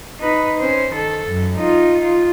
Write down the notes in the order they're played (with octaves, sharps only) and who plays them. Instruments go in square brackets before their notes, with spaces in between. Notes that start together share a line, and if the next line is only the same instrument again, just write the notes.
[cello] D#4 B4
C#4 C5
D#3 A4
F#2
D#4 F4
F4